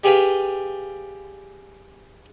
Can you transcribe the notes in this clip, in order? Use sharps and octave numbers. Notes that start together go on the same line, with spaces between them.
G3 G4 G#4 B4 F5 G5